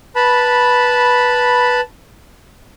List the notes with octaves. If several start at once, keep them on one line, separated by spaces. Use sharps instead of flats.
B4 A5 B5